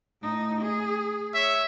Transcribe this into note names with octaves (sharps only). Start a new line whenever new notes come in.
A2 D#4
G#4
C#5 E5